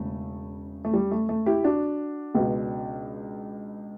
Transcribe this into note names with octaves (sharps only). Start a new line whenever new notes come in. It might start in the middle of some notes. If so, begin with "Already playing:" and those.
Already playing: E1 C#3 A3
A3
G3
A3
A3
E4 G4
D4 F#4
C#2 B2